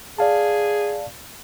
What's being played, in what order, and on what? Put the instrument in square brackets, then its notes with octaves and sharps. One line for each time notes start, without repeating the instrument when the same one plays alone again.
[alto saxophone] G#4 [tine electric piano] D5 F5 A5